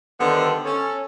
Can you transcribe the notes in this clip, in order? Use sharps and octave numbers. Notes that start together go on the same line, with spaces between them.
D3 D#3 G3 B3 A4 C5
C#4 A4